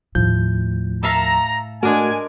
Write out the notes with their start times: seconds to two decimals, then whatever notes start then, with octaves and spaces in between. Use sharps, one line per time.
0.15 D#2 A2 F3 G6
1.03 A4 E5 F5 A#5
1.83 G#3 A3 D4 F#4 A#4 G#5